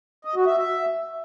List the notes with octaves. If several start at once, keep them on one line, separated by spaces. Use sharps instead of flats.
D#5
F#4
E5
E5